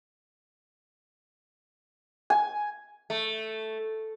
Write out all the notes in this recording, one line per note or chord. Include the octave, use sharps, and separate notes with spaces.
G#5
A3